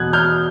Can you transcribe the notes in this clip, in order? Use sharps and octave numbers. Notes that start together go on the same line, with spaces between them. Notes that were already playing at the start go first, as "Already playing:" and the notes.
Already playing: E2 B2 F#6 G#6
F6 G6